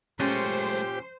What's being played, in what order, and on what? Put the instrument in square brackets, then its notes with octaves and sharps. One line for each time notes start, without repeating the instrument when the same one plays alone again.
[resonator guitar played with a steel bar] A#2 C#4 [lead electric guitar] G#3 A3 [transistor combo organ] G4 [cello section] C5